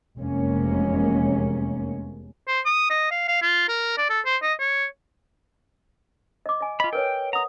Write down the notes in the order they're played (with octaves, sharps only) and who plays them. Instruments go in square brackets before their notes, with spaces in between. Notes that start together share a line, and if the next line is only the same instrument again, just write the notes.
[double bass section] F1 E2 C3 G#3 A#3 C#4
[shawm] C5
D#6
D#5
F5
F5
F4
A#4
D5
A4
C5
D#5
C#5
[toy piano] D#5 D6
D#5 G#5
[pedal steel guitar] F4 B5 [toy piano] D#5
[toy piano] A#4 B4 C#5 [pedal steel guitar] G5
[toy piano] F#5 D#6 [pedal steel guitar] A#5